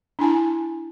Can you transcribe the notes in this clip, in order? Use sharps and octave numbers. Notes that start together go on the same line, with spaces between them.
D4 E4 G#5 A5